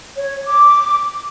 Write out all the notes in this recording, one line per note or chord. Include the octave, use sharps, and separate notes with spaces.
C#5
D6